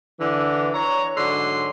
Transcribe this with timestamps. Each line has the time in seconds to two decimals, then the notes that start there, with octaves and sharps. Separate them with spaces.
0.19 D3 E3
0.73 C#5 A#5
1.16 G#2 D3 F#3 C6